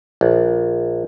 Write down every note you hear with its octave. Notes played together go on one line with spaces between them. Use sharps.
A#1